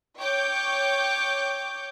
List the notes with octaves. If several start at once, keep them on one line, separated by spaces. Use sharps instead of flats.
C#5 G5 C#6 D6 G6